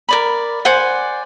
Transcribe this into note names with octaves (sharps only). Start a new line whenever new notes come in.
A#4 D5 B5
C5 D5 F#5 G#5